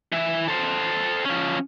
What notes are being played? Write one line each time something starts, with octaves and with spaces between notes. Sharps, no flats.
E3 E4
A4 C5
F3 C#4